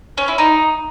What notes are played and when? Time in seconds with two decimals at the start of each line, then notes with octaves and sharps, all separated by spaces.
0.18 C#4
0.28 E4
0.38 D#4